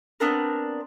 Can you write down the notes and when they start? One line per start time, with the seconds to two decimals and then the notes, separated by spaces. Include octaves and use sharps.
0.20 B3 C4 D4 A#4